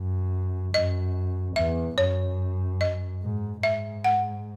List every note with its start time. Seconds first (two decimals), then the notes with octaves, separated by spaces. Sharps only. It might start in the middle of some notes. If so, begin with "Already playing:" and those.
Already playing: F#2
0.74 F#2 D#5
1.56 E2 E5
1.98 F#2 C#5
2.81 D#5
3.22 G#2
3.63 G#2 E5
4.04 F#5